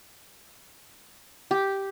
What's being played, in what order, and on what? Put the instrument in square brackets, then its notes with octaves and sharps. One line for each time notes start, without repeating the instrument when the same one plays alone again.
[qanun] G4